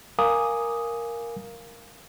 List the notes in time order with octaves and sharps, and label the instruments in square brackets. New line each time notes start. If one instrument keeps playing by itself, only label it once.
[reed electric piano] A#4 F5 G#5 A#5 D6 D#6